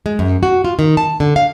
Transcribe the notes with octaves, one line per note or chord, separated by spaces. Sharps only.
G#3
F#2
F#4
F4
D#3
A5
D3
F5